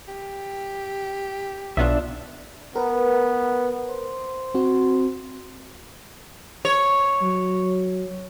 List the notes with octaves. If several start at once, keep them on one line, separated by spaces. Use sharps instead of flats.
G4
B1 B3 D4 F4 E5
B3 A#4 B4
C5
C4 F#4
C#5
F#3